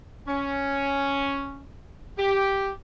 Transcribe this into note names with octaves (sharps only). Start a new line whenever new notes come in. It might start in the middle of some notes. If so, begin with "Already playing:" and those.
C#4
G4